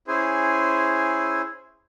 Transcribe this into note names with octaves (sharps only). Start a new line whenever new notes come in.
C#4 E4 G#4 C5 G#5